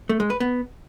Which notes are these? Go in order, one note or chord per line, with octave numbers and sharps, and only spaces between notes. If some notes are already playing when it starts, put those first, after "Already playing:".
A3
G#3
B4
B3